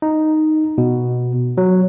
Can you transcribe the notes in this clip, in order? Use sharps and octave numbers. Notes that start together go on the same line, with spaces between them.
D#4
B2
F#3